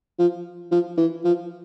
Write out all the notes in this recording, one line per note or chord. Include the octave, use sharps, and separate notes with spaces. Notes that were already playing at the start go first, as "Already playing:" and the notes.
F3
F3
E3
F3